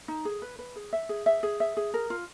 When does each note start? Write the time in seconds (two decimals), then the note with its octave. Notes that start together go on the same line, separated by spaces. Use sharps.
0.08 D#4
0.25 G#4
0.42 B4
0.59 B4
0.76 G#4
0.93 E5
1.09 G#4
1.26 E5
1.43 G#4
1.60 E5
1.77 G#4
1.94 A#4
2.10 F4